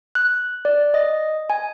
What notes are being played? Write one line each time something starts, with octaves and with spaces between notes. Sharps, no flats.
F#6
D5
D#5
G#5